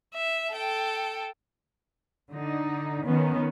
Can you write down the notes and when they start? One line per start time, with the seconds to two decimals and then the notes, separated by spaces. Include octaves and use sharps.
0.14 E5
0.53 A4 G5
2.31 D3 D#4
3.05 D#3 B3 C#4